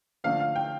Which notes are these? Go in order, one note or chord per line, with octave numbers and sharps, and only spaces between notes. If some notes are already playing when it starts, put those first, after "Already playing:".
D3 F3 A3 D4 F5
F5
G5